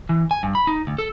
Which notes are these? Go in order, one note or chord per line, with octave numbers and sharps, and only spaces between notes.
E3
G#5
G2
B5
D#4
D2
A4